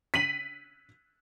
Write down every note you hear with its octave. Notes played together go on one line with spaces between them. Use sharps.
B6 D#7 F#7